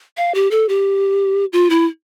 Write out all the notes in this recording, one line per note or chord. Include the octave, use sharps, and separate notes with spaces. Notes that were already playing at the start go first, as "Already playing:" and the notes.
F5
G4
A4
G4
F4
E4